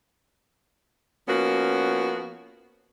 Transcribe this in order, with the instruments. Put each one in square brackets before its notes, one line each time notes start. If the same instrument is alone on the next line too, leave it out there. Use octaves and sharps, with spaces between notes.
[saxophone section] F3 A#3 B3 C#4 F#4